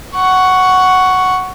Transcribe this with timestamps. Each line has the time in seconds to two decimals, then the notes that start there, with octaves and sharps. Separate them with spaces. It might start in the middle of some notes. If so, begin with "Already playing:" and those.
0.15 F#5 C#6